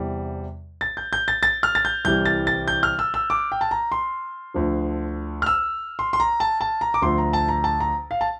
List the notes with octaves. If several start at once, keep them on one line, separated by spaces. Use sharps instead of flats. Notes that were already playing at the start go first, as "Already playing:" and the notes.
Already playing: E2 C3 E3 G3
A6
G6
G6
A6
A6
F6
A6
G6
C2 C3 E3 G3 G6
A6
A6
G6
F6
E6
E6
D6
G5
A5
A#5
C6
D2 D3 F3
F6
E6
C6
C6
A#5
A5
A5
A#5
D6
D2 D3 F3 C6
A#5
A5
A#5
A5
A#5
F5
A5